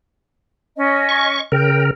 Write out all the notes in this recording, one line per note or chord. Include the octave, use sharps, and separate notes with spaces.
C#4 D#5
C#6
C#3 A#4 G5